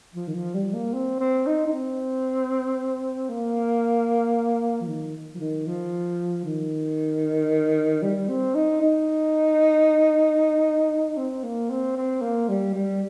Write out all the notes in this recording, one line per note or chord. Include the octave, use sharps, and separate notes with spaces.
F3
D#3
F3
G3
A#3
C4
C4
D#4
D#4
C4
A#3
F3
D#3
F3
D#3
F3
D#3
G3
C4
D#4
D#4
C4
A#3
C4
C4
A#3
G3
G3